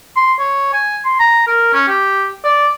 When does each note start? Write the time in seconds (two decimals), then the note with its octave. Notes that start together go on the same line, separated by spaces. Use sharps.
0.17 C6
0.39 C#5
0.73 G#5
1.05 C6
1.20 A#5
1.47 A#4
1.73 C#4
1.88 G4
2.44 D5